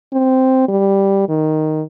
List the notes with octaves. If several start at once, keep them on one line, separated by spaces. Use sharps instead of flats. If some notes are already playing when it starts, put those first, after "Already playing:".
C4
G3
D#3